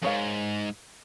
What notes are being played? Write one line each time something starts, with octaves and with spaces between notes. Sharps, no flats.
F2 G#2 D#3 C#5 F5